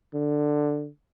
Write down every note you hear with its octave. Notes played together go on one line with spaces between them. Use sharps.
D3